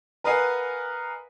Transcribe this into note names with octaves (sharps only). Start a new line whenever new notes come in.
A#4 B4 D#5 F5 F#5 G#5